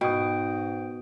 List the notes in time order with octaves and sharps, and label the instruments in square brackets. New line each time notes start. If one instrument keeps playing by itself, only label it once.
[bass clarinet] G#2 [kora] B2 [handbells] G5 D#6